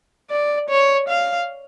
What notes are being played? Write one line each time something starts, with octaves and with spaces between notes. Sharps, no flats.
D5
C#5
F5